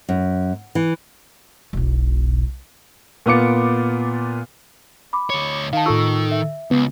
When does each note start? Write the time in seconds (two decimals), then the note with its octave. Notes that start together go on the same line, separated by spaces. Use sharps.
0.09 F#2
0.75 E3
1.73 E1 B1
3.26 A#2 B3 F4 D6 C#7
5.13 B5 D6
5.30 D2 C#5
5.73 D#3 F5 A5
5.86 A2 F4 A4 C#6 E6
6.31 E5
6.71 C#2 B3